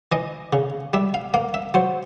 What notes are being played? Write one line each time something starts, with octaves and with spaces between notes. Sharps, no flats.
E3 D#5
C#3
G3 E5
F5
A#3 F5
E5
F#3 C5